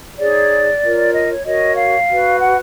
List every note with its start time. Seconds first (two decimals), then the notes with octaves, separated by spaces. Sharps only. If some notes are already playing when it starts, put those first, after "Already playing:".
0.17 D#4 G#4 C#5 D5
0.81 F4 A#4 C#5
1.13 D#5
1.29 C#5
1.44 F#4 A#4 C#5 D#5
1.77 F5
2.08 F#4 B4
2.40 F#5